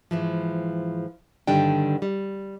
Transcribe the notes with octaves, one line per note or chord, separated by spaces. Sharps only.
G#2 E3 F3
G2 D3 D#3 G3 D4 G5
G3